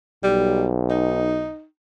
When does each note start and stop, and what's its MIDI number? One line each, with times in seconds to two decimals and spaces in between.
0.24 1.51 35
0.24 0.67 55
0.90 1.64 63